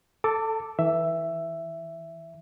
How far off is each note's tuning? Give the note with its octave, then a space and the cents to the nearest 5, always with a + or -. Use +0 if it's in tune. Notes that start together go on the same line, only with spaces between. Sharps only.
A4 +0 A5 +30 D6 -5
E3 -20 E5 +10